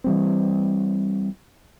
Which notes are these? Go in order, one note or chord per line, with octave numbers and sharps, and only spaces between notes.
E3 G3 C4